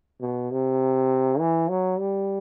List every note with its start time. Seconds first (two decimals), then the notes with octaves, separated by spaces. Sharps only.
0.21 B2
0.51 C3
1.39 E3
1.69 F#3
1.99 G3